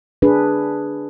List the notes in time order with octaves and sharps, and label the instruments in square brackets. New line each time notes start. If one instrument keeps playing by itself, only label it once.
[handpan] D4 G#4 B4